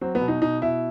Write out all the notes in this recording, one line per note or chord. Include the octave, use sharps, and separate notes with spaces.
F#3 C4
B3
B2
D#4
B2 D#4
B2 E4